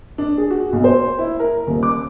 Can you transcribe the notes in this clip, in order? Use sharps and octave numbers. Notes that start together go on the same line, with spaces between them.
D4
G#4
F#4
B1
C5
E4
A#4
D#1
D6